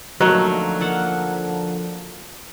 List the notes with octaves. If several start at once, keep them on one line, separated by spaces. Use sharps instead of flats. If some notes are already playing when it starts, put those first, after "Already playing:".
D3 F3 F#3 A3 A#3 D#4
A#3 A4 F#5